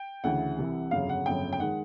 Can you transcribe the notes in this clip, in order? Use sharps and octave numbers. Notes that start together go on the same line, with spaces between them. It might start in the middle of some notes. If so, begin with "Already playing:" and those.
Already playing: G5
D2 C#3 E3 F#5
C2 C3 E3
G1 F2 C#3 F#3 F5
F#5
G1 F2 C#3 F#3 G5
G5
D#3 G#3 F#5